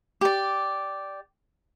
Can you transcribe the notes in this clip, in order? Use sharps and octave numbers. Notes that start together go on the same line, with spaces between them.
G4 D5